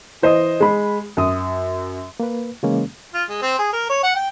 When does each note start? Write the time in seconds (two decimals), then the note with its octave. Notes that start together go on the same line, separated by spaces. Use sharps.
0.22 E3 C5 D#5 D#6
0.60 G#3 B5
1.17 F#2 D#6
2.20 A#3 B4
2.63 C#3 E3 G#3 A#3 C#4
3.14 F4
3.29 G#3
3.42 C4
3.59 G#4
3.73 A#4
3.89 C#5
4.03 F#5
4.15 G5